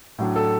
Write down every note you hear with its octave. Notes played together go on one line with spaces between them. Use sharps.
A2 F#3 D4
A4